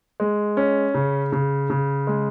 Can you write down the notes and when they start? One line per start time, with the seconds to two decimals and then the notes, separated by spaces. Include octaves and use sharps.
0.20 G#3
0.57 C#4
0.94 C#3
1.33 C#3
1.70 C#3
2.07 G#3